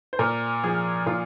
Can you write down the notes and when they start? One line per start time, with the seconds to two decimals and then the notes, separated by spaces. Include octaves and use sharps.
0.13 C5
0.19 A#2 A#4
0.63 F3 G#4
1.06 A#2 F4